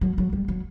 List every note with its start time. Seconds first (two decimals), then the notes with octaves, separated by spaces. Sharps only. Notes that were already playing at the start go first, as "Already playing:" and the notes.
0.01 F#3
0.18 F#3
0.33 G3
0.48 F#3